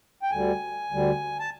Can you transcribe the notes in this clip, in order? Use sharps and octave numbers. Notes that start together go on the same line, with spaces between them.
G5
D2 D3 G3 G#5
D2 D3 G3
A5